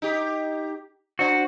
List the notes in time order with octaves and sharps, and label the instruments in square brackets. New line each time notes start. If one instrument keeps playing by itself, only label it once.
[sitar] D#4 G4
[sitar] D4 C5 [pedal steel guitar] F#4